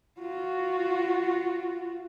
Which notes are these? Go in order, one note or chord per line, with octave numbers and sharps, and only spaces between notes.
F4 F#4